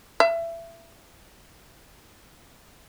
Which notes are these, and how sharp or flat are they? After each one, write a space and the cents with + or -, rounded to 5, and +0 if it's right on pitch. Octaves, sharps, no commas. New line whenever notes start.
E5 +25